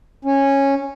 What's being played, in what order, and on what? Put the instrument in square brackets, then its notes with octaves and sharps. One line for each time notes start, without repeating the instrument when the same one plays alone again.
[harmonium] C#4